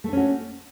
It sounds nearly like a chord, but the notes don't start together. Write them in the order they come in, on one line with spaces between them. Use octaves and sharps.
A3 D4 C#4 F#4